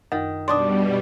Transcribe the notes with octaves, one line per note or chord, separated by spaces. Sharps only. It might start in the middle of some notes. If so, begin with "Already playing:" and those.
F#2 D#3
B2 G3 D4 D5 C6 D#6